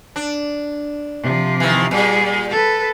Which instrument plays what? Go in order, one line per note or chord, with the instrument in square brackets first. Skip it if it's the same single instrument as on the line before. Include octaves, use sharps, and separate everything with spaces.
[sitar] D4
[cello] C3 F3
[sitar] D#3 E3
[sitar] A#2 [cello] G3 G#4
[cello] A4 B4